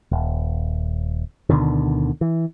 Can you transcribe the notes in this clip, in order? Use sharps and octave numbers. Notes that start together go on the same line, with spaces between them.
D#1
D2 B2 D3 D#3
E3